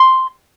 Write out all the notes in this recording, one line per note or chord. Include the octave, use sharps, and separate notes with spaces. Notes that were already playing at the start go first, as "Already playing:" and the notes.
Already playing: C6